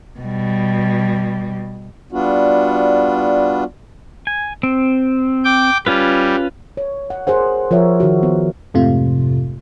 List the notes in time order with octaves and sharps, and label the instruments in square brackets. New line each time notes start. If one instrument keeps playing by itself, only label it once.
[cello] B2 G3
[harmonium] G3 B3 D4 F4 F#4
[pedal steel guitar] G#5
C4
[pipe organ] G5 D6
[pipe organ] G3 [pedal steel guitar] C#4 F4 B4
[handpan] C#5
F#5
G#4 A#4 C5 F#5
F3 A#4 C5 C#5 E5
D#3 F#4
B3
[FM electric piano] F2 G#2 C3 A3 F4